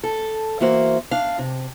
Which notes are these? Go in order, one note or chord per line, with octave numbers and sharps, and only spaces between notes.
A4
E3 A#3 F#4 A#4 C5
D4 F5
C3